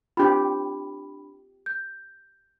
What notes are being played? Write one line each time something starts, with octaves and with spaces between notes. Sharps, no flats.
D4 F4 G4 B5
G6